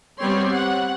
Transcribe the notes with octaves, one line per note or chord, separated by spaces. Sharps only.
G3 B3 C4 C#5 C6
F#5